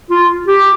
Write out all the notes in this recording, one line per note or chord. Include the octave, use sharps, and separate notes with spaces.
F4
G4